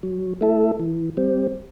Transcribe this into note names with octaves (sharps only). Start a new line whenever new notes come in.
F#3
A3 E4 A4
E3
G3 C4